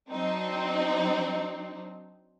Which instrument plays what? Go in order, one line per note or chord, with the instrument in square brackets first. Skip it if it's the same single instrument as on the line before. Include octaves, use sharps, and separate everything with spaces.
[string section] F#3 C4 D4 D#4